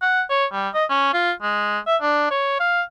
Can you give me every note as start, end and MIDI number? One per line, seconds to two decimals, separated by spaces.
0.02 0.22 78
0.30 0.45 73
0.52 0.69 55
0.74 0.84 75
0.90 1.13 61
1.13 1.31 65
1.42 1.79 56
1.87 1.96 76
2.02 2.26 62
2.31 2.58 73
2.60 2.82 77